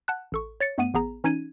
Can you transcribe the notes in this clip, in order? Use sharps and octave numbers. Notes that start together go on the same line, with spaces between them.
F#5 A5 F#6
A1 A4 C#6
C#5 A6 C#7
G2 A3 B3 F#5 D#7
A1 B3 G#4 A#5
E3 C#4 D#4 G#6 D#7